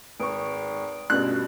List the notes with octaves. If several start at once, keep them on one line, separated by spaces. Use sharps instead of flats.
G#1 B4 C#6 D#6 D7
G2 B2 A3 C#4 F4 F#6